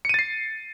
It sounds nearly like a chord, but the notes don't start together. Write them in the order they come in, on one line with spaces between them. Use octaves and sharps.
C#7 D#7 A6 C7